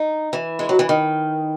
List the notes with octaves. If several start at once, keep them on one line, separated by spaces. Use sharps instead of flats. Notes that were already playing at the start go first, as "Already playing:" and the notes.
Already playing: D#4
E3
G#3
F#3
E3
D#3